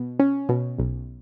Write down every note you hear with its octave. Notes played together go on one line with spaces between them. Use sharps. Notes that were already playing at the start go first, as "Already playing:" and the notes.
Already playing: B2
C#4
B2
B1